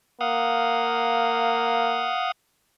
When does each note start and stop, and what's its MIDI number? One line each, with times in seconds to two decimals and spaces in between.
0.21 2.12 58
0.21 2.32 77
0.21 2.32 78
0.21 2.32 87